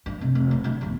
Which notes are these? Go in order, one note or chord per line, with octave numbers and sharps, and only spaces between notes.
G2
C3
F1
G2
D3 G3
G1 E2